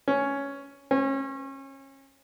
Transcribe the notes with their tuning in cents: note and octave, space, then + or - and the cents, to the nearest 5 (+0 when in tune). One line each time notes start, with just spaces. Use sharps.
C#4 +5
C#4 -30